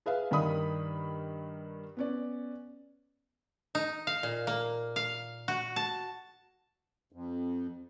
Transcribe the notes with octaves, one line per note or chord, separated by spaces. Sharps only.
G#4 B4 E5 F5
G2 D#3 A#4 B5 D#6
B3 C#4 D5
D#4
F5
A#2
A#3
F5
F#4
A5
F2